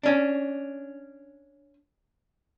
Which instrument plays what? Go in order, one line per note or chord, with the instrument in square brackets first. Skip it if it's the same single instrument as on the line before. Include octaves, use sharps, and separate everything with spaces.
[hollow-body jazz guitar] C#4 D4